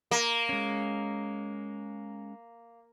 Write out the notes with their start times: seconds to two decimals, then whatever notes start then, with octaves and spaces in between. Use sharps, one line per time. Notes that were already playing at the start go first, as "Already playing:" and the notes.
0.11 A#3
0.49 G#3 C#4